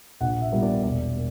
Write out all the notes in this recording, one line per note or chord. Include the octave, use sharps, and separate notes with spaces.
A#1 F#5
E5
A#2 G3 B3
D5
E1 D5
A#3